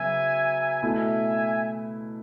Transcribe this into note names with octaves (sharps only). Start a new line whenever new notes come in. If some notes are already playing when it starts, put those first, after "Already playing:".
Already playing: C#3 F#3 B3 E5 G#5
B2 A3 E4 E5 G#5